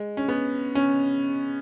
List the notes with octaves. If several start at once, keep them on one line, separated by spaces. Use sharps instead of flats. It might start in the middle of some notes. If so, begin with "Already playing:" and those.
Already playing: G#3
C#4
B3
C#4